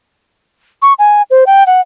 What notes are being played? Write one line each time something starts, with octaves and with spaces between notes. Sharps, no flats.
C#6
G#5
C5
G5
F#5